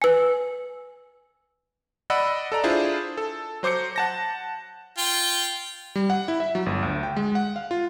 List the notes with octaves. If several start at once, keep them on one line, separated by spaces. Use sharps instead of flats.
B4 G#5
D5 D#5 F#5 B5 E6
A4 D5 A#5
D4 E4 F4 G#4 C5
A4
F#3 C5 D6 G6 C#7
F#5 A5 A#6
F4 G5
G3
F#5
E4
E5
F#3
G1
D2
G5
G#3
F#5
F5
F4